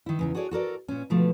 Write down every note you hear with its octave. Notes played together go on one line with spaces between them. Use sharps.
D#3 E4
E2 C#3 D#4
F#4 G#4 A4 C#5 D5
F#4 A4 A#4 D5
A#2 C#4
B2 D3 F3 A3